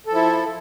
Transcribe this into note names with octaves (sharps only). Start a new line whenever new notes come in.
F3 E4 A4